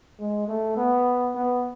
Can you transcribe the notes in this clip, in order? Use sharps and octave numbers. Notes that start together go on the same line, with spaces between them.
G#3
A3
B3
B3